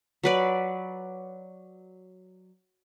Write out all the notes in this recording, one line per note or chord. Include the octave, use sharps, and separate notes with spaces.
F#3 B4 D5